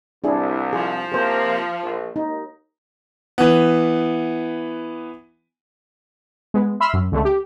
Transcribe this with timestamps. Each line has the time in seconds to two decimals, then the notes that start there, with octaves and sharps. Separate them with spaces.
0.24 C2 D4 E4 G#4
0.73 F3 G#4
1.12 C3 A#3 G#4 C5
1.83 A#1
2.16 D#2 D#4
3.38 E3 B3
6.54 G#3 B3
6.80 E5 B5 C6 E6 F6
6.94 F#2
7.12 C#2 D3 A3
7.25 G4